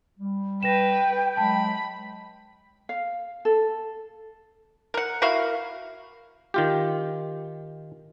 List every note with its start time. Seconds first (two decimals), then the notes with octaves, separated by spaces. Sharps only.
0.18 G3
0.63 B4 G5 A#6 E7
1.37 F#3 G#3 A5 B5
2.89 F5
3.45 A4
4.94 A#4 F#5
5.22 E4 F#4 A#4 F5
6.54 D#3 F4 G4